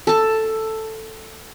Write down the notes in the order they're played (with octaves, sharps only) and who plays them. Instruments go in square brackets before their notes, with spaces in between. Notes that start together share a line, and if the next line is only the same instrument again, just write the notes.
[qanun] A4 A5